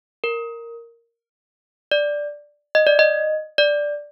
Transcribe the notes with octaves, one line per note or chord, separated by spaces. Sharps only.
A#4
D5
D#5
D5
D#5
D5